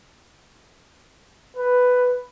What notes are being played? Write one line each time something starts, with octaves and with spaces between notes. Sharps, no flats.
B4